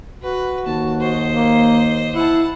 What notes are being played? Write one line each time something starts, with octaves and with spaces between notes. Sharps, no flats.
F#4 B4
D#2 A5
C5 D#5
A#3
E4 F#5 A5